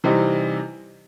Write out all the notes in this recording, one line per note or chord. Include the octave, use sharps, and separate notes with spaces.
C3 E3 G3 C4 D#4